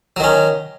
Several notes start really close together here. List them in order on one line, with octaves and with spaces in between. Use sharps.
F#3 D#3 C#4